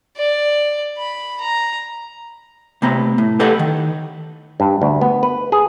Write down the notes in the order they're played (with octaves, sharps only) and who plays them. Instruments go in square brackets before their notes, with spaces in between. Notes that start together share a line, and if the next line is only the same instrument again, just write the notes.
[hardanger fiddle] D5
B5
A#5
[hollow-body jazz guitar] C3 A3 B3 A#5
A2
G4 A4 B4 D#5 F#5
D#3
[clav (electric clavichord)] G2
D2
B3
B4
G#4